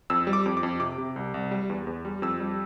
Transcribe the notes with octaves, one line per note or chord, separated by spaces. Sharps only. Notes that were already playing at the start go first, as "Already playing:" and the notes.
F2 E6
G3
D6
F2
D6
F2
C3 D6
C3
C2
C2
G3
E2
E2
G3
F2 E6
G3